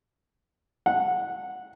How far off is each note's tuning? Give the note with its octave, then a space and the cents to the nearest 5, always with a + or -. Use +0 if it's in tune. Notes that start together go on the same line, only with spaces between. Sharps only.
F#5 -15